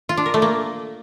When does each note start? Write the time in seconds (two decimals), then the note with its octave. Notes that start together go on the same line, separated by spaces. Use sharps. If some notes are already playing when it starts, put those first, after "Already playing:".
0.09 F4
0.17 D4
0.26 A#4
0.34 A3
0.42 A#3